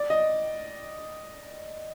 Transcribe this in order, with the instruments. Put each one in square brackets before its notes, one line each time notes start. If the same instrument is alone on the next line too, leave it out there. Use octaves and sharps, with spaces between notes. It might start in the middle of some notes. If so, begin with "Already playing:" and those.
Already playing: [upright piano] D5
D#5